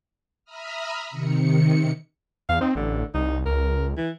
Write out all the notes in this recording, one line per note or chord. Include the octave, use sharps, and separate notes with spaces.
E5 A#5 B5 D#6 F6
C3 D#3 C#7
E2 F5
C4 D#4
A1 D3
C2 D#4
C#2 A#4
E3